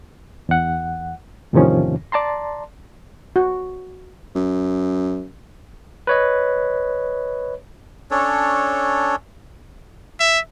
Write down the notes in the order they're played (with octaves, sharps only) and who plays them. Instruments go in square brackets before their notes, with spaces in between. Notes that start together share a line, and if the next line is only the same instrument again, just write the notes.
[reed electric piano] E2 F#5
E2 A2 C3 D#3 F3 C#4
D5 A5 A#5 C6
[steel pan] F#4
[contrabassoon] F#2
[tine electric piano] B4 C#5 D#5
[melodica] C#4 D4 A4 C#5
[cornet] E5